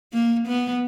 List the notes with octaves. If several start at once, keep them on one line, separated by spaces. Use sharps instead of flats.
A#3
B3